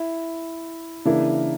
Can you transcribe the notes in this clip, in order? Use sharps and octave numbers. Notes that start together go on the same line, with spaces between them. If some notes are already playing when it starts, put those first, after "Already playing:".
Already playing: E4
C#3 E3 A#3 D4 E4